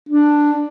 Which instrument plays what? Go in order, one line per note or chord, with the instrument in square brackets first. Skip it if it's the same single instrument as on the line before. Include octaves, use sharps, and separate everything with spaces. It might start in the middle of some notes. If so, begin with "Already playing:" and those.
[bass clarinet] D4